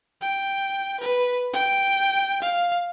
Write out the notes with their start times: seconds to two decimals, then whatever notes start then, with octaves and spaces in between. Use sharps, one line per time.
0.21 G5
1.00 B4
1.53 G5
2.42 F5